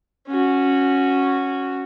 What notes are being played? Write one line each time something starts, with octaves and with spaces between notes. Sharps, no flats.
C#4 F#4